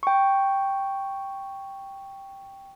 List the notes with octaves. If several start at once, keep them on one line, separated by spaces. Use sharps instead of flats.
G5 C#6